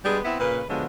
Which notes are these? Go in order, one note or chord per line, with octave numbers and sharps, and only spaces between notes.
G3 G#3 B3 D4 G#4
B3 C4 E4
A#2 C#3 B4
D3 F3 F#3 G#3 B3